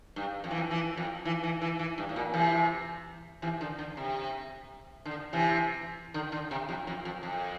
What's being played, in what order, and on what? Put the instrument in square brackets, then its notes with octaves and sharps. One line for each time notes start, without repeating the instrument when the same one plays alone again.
[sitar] G2
F2
E3
F2
E3
F2
E3
E3
E3
E3
G2
A2
A#2
C3 E3
C3 E3
D3
D3
C3
D3
C3 E3
D3
D3
C3
F2
F2
F2
F2